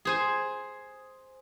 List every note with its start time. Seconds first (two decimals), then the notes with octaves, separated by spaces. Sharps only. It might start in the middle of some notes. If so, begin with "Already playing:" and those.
0.05 G#4 C5 G#5